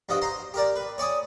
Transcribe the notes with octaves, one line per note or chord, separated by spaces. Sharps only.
G2 F3 F#4 D#5
C5 A#5 C6
G4 A#4 D5
B4
C#5 D5 G#5 D#6